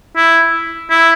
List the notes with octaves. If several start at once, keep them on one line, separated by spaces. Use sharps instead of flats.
E4
E4